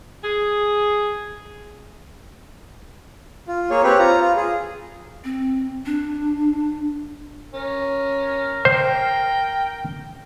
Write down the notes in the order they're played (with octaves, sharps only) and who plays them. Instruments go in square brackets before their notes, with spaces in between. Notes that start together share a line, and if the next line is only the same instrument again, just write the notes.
[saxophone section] G#4
[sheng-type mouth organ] F4
A#3 G#4 C#5
C4 G4 B4 C#5
F4 A#5
F4
G#4
[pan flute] C4
D4
[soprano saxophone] C#4 [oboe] A#4
[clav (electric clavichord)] C5 [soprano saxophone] G5